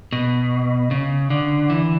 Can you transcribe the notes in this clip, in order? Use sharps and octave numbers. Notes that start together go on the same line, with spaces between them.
B2
C#3
D3
E3